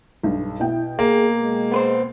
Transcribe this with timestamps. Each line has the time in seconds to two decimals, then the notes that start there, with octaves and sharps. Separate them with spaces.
0.23 B1 G2
0.60 B2 E4 G5
0.99 A#3 G#4
1.38 G#3
1.72 B3 B4 C5